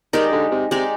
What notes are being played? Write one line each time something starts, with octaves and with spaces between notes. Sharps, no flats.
D#3 G#3 D#4 G4 D5
D3
C3
C3 G#3 D#4 G4 D5